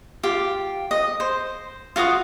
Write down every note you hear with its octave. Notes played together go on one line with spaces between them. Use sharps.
F4 G4
D#5
C5
F4 F#4 F5 D#6